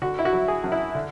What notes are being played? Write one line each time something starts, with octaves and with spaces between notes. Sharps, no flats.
D3 F#4
E4
F#4
F#3
G#4
F#2
E4
D3